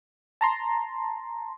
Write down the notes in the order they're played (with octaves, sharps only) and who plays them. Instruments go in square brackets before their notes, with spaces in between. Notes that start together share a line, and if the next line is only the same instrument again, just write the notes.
[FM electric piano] A5 A#5 C6